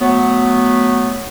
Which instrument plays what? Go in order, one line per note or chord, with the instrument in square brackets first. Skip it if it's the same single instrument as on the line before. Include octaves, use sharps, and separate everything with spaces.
[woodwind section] F#3 A3 B3